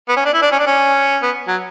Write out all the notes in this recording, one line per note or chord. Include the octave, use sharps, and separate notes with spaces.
B3
C#4
D4
E4
D4
C#4
D4
C#4
B3
F#3